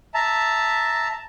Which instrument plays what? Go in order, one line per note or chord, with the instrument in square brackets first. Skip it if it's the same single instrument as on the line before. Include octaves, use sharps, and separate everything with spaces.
[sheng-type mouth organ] E5 A5 A#5